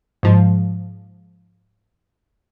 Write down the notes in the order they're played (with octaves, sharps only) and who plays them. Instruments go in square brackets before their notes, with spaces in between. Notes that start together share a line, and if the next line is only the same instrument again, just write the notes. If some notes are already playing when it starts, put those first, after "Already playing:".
[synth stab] G#2 F3